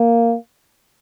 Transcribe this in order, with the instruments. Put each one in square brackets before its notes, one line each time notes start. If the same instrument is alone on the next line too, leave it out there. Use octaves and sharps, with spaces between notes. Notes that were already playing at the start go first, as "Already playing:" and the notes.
Already playing: [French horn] A#3